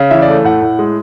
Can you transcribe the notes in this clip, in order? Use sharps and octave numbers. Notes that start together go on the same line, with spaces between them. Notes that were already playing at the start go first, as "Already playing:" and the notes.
Already playing: C#3
E3 E5
D5
A3
A2 F#5
A2
G#3